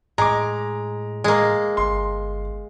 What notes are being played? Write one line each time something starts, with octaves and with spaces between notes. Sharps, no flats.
A2 G#3 A#5 D6
G#3 A#3
G1 C6